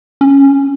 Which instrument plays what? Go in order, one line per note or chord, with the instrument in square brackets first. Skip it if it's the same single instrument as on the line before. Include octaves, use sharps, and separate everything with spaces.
[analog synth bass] C#4